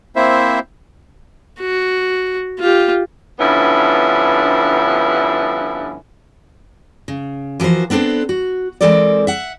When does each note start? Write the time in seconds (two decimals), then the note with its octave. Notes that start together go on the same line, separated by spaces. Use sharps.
0.16 A#3 C4 E4 C5 E5
1.60 F#4
2.59 F4 G4
3.39 G2 D3 F3 B3 C#4 E4
7.08 C#3
7.60 E3 F3 F#4 A#4 C5
7.90 B3 C4 D4 A4 C5
8.29 F#4
8.81 E3 G#3 C4 A4 A#4 D5
9.27 E5 F#5